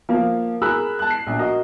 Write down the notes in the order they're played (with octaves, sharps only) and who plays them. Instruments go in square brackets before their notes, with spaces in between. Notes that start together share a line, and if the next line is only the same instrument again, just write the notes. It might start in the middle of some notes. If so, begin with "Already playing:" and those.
[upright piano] F3 A#3
G#4 A#4 B5 E6 F#6
A5 F#6
C7
A#1
F#4 A#4 D#5